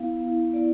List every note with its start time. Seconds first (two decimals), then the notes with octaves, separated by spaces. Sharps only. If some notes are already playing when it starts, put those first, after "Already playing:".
Already playing: B3 E4 F5
0.18 B3
0.23 E4
0.53 B3 E4 D5